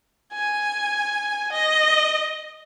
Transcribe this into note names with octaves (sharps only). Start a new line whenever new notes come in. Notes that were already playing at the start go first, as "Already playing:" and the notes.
G#5
D#5